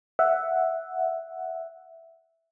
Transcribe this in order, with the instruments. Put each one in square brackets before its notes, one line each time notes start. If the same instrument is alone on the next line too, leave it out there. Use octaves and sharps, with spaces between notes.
[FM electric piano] E5 F#5